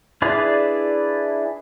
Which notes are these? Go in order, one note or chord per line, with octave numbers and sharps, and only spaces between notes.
D4 E4 G#4 B4 D5